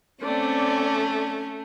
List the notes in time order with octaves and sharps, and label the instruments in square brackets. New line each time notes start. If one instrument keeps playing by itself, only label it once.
[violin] A3 [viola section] C4 D5 [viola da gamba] C#4